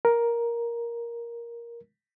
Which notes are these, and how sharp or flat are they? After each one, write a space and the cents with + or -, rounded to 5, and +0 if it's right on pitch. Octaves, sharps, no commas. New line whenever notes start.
A#4 +10